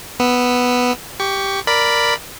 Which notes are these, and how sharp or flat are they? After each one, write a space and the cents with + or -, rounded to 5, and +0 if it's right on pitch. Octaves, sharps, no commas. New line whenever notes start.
B3 +0 E6 +0
G4 +0 C#6 +20
A#4 +0 D5 +0 B5 +0